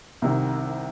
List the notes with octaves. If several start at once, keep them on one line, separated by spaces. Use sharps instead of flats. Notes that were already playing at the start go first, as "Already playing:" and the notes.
C2 C3 D#3